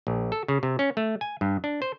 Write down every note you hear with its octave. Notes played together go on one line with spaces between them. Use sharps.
A#1
A4
C#3
C3
C#4
A3
G#5
G2
D4
C5